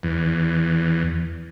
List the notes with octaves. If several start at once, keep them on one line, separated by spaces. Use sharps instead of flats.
E2